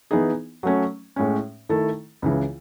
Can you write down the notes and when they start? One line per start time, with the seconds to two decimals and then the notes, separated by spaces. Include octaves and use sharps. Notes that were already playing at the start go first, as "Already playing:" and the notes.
0.11 E3 B3 D#4 G#4
0.63 F#3 A3 C#4
1.16 A2 G#3 C#4
1.69 D#3 A3 E4 A4
2.22 C#2 C#3 E3